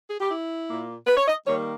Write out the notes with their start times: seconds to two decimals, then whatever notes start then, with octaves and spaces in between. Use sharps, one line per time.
0.09 G#4
0.20 G4
0.31 E4
0.70 A#2 A#3
1.07 B4
1.17 C#5
1.27 D#5
1.46 D#3 G3 A#3 C#5